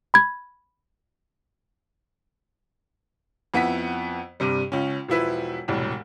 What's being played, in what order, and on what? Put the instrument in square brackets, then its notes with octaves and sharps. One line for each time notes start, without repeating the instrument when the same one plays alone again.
[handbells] B5 G#6
[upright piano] F2 B3 E4 F#5 B6
G2 C3 G3
C#2 C#4
E1 F3 E4 B4
E1 C2 A2